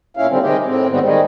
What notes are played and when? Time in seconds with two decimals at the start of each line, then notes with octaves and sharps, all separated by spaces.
0.17 A#2 C#4 E4 F5
0.29 D3 D#3 G3 C4
0.41 C3 D#3 G#3 G4
0.65 A2 C4
0.90 G#2 D#3 G3 B3 C4
1.02 D#3 G3 G#3